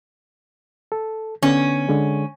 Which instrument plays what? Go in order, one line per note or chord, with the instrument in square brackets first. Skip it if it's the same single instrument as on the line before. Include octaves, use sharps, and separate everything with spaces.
[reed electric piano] A4
[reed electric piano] D3 B3 [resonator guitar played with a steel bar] C#4
[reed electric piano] D3 G#3